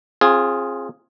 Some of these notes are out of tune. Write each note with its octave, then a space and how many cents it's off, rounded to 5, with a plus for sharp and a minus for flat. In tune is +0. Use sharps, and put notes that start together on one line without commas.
C4 +35 F4 +0 G#4 +0